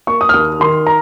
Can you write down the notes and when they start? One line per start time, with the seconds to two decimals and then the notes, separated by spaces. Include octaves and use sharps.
0.07 A#3 C#6
0.21 D#6
0.29 F6
0.34 D#2 D#6
0.60 D#3 C6
0.86 A#5